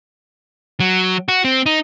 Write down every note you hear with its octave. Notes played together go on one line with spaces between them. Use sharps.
F#3
F#4
C4
D#4